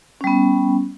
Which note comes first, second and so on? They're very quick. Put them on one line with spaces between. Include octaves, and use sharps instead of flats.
C#4 G3 B3